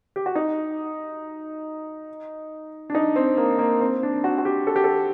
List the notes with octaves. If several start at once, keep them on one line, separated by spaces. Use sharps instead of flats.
G4
F#4
D#4
D4
D#4
C4
A#3
A#3
C4
D4
F#4
F#4
G4
A4
G4
A4